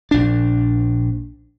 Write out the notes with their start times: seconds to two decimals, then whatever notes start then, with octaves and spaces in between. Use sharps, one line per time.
0.11 A#1 D4